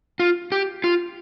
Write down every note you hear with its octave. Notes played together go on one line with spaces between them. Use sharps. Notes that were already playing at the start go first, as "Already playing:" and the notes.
F4
G4
F4